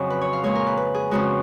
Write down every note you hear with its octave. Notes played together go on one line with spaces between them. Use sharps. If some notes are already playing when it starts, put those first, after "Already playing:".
Already playing: F2 C#3 F#3 D#5
B4
C#5
F5
A#2 G#3 C#5
A#4
B4
B4
G#4
F2 C#3 G#3 F#4